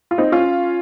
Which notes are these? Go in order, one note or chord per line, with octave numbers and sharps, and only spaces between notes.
F4
C4 D#4
C#4 F4